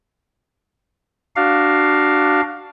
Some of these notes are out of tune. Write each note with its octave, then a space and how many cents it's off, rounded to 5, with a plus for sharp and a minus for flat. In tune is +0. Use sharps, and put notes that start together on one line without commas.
D4 +10 F#4 +20 F5 +5